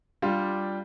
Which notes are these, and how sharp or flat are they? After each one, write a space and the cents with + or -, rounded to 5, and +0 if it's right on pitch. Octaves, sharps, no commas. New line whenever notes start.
G3 +0 D4 +0 F4 +0